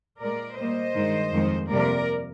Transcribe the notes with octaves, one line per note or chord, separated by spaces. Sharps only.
A#2 G#3 A#4 D5
A#2 G3 A#3 C5 D#5
G2 D#3 G#3
F2 D#3 G#3
F2 C3 G3 A#3 A#4 D5